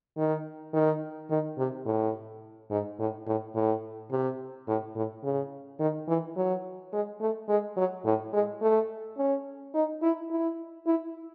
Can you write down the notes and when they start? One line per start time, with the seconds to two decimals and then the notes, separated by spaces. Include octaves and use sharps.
0.17 D#3
0.73 D#3
1.30 D#3
1.58 C3
1.86 A2
2.71 G#2
2.99 A2
3.27 A2
3.55 A2
4.11 C3
4.68 A2
4.96 A2
5.23 C#3
5.80 D#3
6.08 E3
6.36 F#3
6.93 G#3
7.21 A3
7.49 G#3
7.77 F#3
8.05 A2
8.33 G#3
8.62 A3
9.18 C#4
9.74 D#4
10.02 E4
10.31 E4
10.86 E4